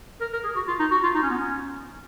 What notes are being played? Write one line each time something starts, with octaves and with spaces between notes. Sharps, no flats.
A#4
A#4
G#4
F#4
F4
D#4
F#4
F4
D#4
C#4
B3
C#4